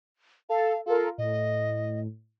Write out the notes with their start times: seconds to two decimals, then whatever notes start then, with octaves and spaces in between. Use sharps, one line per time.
0.49 A4 F5
0.86 F4 A4 A#4
1.18 A2 D#5